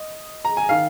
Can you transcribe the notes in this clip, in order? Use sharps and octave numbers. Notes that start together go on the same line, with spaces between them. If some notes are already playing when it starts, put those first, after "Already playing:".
Already playing: D#5
A#5
G#5
D#3 F5